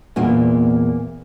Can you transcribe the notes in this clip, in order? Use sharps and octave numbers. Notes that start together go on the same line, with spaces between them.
E2 A#2 A#3